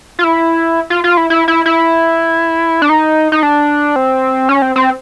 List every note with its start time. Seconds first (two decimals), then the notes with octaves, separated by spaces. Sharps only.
0.19 F4
0.24 E4
0.90 F4
1.04 F4
1.17 E4
1.30 E4
1.48 E4
1.66 E4
2.82 D4
2.89 D#4
3.32 D#4
3.43 D4
3.96 C4
4.49 C#4
4.62 C4
4.76 C4